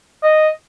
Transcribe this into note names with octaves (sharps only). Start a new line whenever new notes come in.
D#5